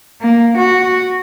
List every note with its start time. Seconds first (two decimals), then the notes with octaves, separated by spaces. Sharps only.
0.21 A#3
0.57 F#4